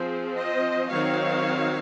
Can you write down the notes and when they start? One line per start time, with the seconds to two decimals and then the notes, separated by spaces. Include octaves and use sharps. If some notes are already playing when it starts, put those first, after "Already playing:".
Already playing: F3 C4 G#4 C5
0.35 C5 D#5
0.90 D#3 F#3 C4 C#5 F5